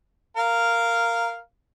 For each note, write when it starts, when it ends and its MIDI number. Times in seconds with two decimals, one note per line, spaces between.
0.37 1.38 70
0.37 1.38 77